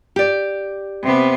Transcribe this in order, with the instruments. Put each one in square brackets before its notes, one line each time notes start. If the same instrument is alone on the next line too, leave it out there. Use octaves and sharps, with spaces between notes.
[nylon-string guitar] G4 D5
[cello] C3 B3